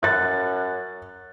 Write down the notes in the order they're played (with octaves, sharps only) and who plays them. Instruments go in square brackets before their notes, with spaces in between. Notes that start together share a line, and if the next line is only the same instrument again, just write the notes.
[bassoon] F#2 [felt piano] F#6 A6